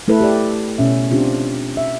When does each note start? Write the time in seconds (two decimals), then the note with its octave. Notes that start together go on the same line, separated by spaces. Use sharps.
0.08 A3 E4 A4 B4
0.21 G4 D5
0.78 B2 C#4 E5
1.11 C4 D4 F4 G4
1.77 E5